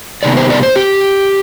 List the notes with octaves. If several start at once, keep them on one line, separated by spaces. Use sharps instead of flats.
C3 D#3 G3 B3 D5
C5
D5
C5
G4